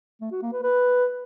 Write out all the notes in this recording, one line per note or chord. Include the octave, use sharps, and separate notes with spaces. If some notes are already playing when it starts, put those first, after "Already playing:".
A3
F#4
A#3
B4
B4